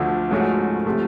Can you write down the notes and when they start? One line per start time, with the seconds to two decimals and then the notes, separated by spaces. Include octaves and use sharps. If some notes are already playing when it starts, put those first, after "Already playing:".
Already playing: D2 D3 F3 A3
0.31 G#2 F3 A3 C#4 F#4
0.86 C3 F3 A3